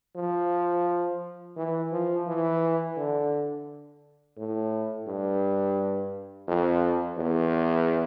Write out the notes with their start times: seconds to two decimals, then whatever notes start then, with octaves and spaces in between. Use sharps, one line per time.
0.16 F3
1.57 E3
1.92 F3
2.27 E3
2.97 D3
4.37 A2
5.08 G2
6.48 F2
7.17 E2